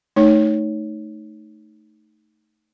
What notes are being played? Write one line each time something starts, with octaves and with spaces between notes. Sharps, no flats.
A3 D#4 C#5